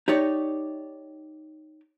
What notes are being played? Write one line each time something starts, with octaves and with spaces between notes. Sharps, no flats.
D#4 G4 C#5 D5